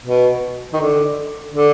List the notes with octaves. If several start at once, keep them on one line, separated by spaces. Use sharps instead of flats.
B2
D#3
D3
D3